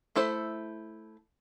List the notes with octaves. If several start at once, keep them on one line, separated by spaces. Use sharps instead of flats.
A3 E4 A4 C5